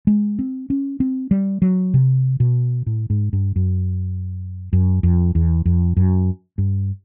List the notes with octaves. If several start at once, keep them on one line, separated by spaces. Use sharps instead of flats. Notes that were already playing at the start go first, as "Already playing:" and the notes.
G#3
C4
C#4
C4
G3
F#3
C3
B2
A2
G#2
G2
F#2
F#2
F2
E2
F2
F#2
G2